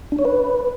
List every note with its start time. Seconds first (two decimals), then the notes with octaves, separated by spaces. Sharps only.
0.12 D4
0.19 C#5
0.25 B4